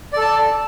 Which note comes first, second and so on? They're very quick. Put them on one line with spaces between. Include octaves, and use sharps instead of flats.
D5 A4 A5